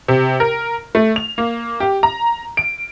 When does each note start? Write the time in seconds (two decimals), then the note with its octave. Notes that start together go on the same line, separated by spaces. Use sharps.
0.08 C3
0.40 A#4
0.95 A3
1.16 F7
1.38 A#3
1.80 G4
2.03 A#5
2.57 D7